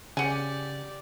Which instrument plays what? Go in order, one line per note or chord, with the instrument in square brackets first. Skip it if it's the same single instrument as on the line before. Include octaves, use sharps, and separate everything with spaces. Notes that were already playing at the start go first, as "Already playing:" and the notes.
[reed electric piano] C#3 [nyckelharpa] G4 D5 [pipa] F#5 G#5